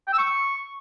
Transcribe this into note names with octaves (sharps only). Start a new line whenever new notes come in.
G5
E6
C#6